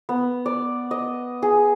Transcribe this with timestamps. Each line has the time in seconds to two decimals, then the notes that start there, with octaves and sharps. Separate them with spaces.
0.09 B3
0.46 D5
0.91 D#5
1.42 G#4